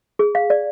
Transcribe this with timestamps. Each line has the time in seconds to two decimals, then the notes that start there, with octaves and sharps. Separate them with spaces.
0.19 G#4
0.35 F5
0.50 D5